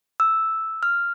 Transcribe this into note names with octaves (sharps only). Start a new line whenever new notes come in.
E6
F6